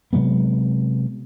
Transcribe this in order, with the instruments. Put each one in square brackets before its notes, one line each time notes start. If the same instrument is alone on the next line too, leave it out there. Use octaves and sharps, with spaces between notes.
[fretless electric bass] C3 F#3 G#3 B3